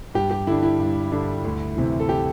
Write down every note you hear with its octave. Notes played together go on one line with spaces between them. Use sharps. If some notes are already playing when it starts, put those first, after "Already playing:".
G2 G4
G4
D3 G3 D4 E4
E4
G2
D3 G3 D4
D2
C3 E3
A4
G4